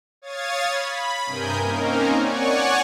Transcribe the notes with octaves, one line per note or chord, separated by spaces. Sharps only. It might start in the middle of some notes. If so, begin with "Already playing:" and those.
C#5 F5 D#6 G#6 A6
B5
G2 C3 A#4 G#5 D#6 G6
A#3 C4 C#4 D#4 A#4
C#5 D5 F#5 G#5 C#6